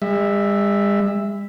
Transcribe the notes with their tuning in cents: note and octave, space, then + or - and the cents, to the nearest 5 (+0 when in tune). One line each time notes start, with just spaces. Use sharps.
G#3 -45 E5 +0